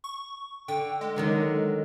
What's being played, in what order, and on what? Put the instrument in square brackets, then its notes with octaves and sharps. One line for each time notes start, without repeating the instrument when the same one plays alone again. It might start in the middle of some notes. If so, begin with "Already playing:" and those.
[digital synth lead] C#6
[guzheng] D3 [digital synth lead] G5
[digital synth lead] G#3
[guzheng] D3 D#3 F#3